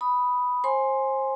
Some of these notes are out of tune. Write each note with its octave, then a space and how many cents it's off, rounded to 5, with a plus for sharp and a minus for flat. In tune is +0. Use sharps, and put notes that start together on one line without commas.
B5 +0 D#6 +0
C5 +30 G#5 +0 C6 +0